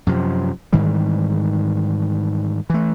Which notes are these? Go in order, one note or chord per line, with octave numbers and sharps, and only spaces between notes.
F#2 C3 F3
G#2 D#3 E3 G3
E3 A3